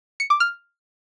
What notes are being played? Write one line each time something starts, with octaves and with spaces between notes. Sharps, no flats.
C#7
D6
F6